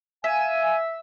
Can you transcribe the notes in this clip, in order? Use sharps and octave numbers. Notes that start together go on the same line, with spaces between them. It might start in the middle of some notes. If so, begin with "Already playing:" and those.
E5 F5 G#5